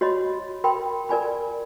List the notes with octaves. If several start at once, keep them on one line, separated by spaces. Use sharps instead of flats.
F#4 C#5 D#5 B5 C6
A#4 G5 B5 C6
A#4 D5 G#5 B5